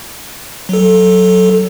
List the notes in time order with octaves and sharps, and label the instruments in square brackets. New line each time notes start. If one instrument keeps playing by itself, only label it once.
[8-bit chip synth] F#3 A4